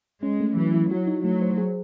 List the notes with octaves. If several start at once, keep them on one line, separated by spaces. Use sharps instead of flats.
G#3 C#4
A3
E3 F#3
E4
F#3 F#4
D#4
F#3 A3
C5
G#4